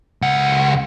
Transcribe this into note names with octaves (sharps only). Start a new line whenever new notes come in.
C#2 F#5